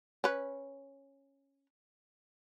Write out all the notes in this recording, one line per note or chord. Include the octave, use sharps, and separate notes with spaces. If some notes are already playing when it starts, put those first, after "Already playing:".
C#4 B4